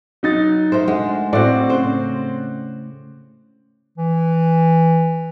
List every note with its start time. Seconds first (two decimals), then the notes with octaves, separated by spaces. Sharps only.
0.23 F#3 D#4 A6
0.72 A3 A#4 C5
0.88 G#3 A3 D4 F#5
1.33 A2 C4 F#4 D5 F#5
1.70 C#3 C5
3.98 E3